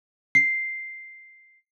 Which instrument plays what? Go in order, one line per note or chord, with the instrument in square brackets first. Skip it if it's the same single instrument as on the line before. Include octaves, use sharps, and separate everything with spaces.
[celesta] C7